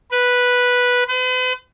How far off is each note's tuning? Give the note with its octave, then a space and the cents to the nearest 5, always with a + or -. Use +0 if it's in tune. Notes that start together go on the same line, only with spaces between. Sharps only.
B4 -5
B4 +45